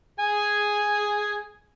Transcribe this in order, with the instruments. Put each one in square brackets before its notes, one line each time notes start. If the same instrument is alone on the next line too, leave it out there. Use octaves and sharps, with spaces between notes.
[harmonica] G#4 G#5